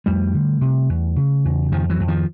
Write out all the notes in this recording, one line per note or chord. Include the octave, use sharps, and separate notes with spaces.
F2 G3 A3
D3
C3
E2
C#3
E2
F2 D#3 F3
E3 F#3
F2
D#3 F3